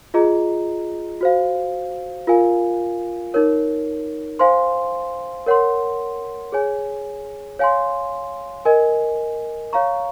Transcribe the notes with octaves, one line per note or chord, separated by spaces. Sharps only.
F4 G#4 D#5 A#5
F#4 C5 F5
F4 A#4 F5 G#5
D#4 A#4 C#5
C5 F5 G#5 C6
A#4 C#5 F#5 C6
G#4 C#5 G#5
C#5 F5 G#5 C6
A#4 D#5 G#5
C#5 F5 A#5 C#6